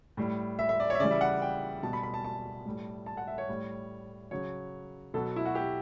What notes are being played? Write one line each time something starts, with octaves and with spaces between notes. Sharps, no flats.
A2 G3
E5
E5
D5
C#5 E5
C#3 E3 G3 D5
E5
F#5
G5
B2 G3 A5
B5
B5
A5
A5
A2 G3
A5
F#5
E5
C#5
A2 G3
C#3 F#3 C#5
B2 F#3 A4
E4
F#4
G4